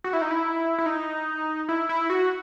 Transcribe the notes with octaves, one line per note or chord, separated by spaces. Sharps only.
F#4
E4
D#4
E4
E4
D#4
E4
E4
F#4